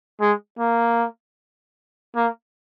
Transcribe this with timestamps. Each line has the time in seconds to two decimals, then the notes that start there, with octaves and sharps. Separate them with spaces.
0.21 G#3
0.59 A#3
2.16 A#3